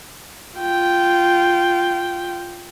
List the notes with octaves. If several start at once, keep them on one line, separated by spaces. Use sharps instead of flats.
F4 G5